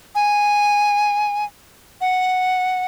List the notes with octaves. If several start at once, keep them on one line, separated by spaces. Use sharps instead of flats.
G#5
F#5